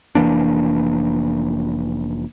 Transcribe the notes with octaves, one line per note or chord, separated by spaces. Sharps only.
F1 E3 A#3 D4